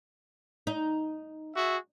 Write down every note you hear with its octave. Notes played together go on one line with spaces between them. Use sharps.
D#4
F#4 G#4 E5